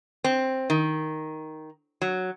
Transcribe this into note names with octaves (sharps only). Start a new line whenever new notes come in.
C4
D#3
F#3